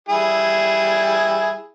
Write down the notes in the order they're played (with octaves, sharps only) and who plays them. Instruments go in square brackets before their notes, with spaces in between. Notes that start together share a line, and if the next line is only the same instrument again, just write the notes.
[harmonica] G3 E4 G#4